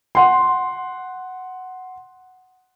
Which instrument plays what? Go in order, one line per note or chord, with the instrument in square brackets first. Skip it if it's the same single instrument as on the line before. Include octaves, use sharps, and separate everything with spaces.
[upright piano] F#5 C6